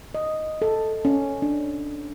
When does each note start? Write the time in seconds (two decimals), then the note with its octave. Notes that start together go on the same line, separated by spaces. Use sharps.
0.15 D#5
0.62 A4
1.05 C#4
1.42 D4